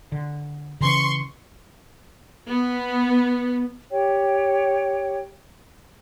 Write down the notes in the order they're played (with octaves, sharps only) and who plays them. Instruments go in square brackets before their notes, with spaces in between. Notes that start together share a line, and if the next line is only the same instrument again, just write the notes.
[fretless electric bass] D3
[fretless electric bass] C#3 E3 C#4 [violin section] C6 C#6
[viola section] B3
[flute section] G4 C#5 G5